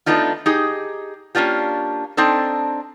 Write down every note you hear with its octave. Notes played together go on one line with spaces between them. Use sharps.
A3 B3 D4 D#4 F4
D#4 G4 G#4
A#3 C#4 D4 F4 G4
C4 D4 D#4 A4